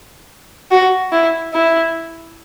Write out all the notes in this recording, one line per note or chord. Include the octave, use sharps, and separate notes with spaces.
F#4
E4
E4